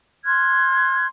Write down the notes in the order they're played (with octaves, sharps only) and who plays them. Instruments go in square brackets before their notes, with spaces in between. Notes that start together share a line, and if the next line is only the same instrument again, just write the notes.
[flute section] C6 F6 F#6 G#6